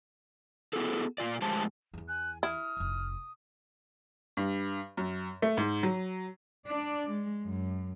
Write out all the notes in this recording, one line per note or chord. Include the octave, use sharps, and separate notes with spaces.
B3 C4 E4 F#4 G#4 A4
A#2 F4 D5
F2 A2 G#3 G4 C5 A5
E2 E3
G#5 F#6
E4 D#6 F6
F1 F2
G2
F#2
A3
G#2
F#3
D4 D5
G#3
F#2